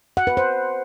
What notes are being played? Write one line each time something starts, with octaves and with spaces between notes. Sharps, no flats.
F#5
B4
C5